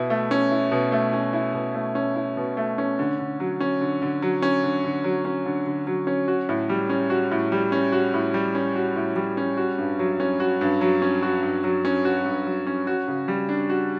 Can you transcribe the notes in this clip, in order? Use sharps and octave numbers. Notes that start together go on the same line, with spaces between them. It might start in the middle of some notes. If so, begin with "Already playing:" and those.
Already playing: B2 E4
A3
C#4
E4
B2
A3
C#4
E4
B2
A3
C#4
E4
B2
A3
C#4
D3
D3
F#3
C#4
D3
D3
F#3
C#4
D3
D3
F#3
C#4
D3
D3
F#3
C#4
F#4
A2
G3
C#4
F#4
A2
G3
C#4
F#4
A2
G3
C#4
F#4
A2
G3
C#4
F#4
G2
F#3
C#4
F#4
G2
F#3
C#4
F#4
G2
F#3
C#4
F#4
G2
F#3
C#4
F#4
C#3
G3
D4
F#4